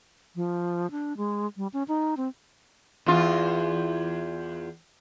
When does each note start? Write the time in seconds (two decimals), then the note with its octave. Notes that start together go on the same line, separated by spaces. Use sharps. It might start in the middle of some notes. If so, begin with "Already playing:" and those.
0.36 F3
0.91 D4
1.17 G#3
1.57 G3
1.73 C#4
1.88 D#4
2.17 C4
3.06 E2 F4